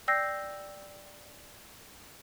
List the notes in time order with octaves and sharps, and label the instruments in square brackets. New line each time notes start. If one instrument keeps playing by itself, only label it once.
[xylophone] D5 G5 E6 G6 A#6 C7